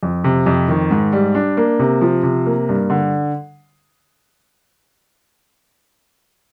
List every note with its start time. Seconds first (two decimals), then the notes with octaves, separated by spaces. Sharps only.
0.03 F2
0.24 C3
0.47 F2
0.69 D#3
0.91 G#2
1.13 G3
1.35 D4
1.57 A#3
1.79 C3
2.01 F3
2.23 C3
2.46 A#3
2.69 G2
2.90 D3